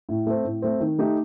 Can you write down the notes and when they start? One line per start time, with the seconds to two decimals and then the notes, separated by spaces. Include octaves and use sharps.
0.09 A2
0.27 A3 C4
0.45 A2
0.62 A3 C4
0.80 D#3
0.98 A3 D#4 G4